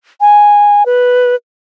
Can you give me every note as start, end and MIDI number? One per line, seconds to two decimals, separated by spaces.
0.21 0.86 80
0.86 1.35 71